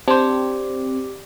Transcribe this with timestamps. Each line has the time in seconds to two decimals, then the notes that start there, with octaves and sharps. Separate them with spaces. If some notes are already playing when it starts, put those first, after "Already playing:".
0.08 C4 D4 G4 C5